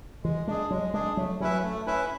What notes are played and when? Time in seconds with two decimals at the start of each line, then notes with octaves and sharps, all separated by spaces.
0.24 E3 G#3
0.47 G#3 D4 G#4
0.71 F#3 G#3
0.93 G#3 D4 G#4
1.17 F#3 A3
1.40 F#3 C#4 E4 B4 E5
1.63 A3
1.86 C#4 E4 B4 E5